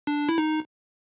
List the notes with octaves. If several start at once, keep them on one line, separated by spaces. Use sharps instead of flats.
D4
E4
D#4